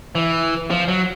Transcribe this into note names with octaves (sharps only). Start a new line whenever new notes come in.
E3
F3
F#3